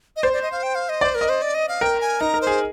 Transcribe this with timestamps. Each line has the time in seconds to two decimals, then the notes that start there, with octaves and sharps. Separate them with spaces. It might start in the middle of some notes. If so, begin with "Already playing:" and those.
0.16 D#5
0.23 C5 D5
0.33 D5
0.42 D#5
0.52 F5
0.63 G5
0.75 F5
0.89 D#5
1.01 C5 D5
1.15 A#4
1.21 D#5
1.29 C5
1.42 D5
1.54 D#5
1.68 F5
1.81 A#4 G5
2.01 G#5
2.20 D#4 A#5
2.34 A#4
2.41 C5
2.47 G#4